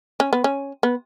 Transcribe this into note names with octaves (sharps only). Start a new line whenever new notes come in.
C#4
B3
C#4
B3